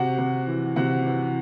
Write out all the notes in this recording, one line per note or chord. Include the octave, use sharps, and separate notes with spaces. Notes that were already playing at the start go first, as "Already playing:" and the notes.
Already playing: C3 F#4 F#5
C3
E3
C3 F#4 F#5
E3